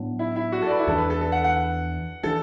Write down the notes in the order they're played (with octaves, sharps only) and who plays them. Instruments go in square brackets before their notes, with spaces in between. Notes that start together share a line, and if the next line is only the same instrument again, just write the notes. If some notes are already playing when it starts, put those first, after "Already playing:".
Already playing: [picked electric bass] A2 F#3 B3 D4
[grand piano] E4
E4
F#4
A4
D5
B4
E4
[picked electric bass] E2 E3 D4 [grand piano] A4
[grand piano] B4
A4
A4
F#5
F#5
[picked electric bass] E3 D4 [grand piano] A4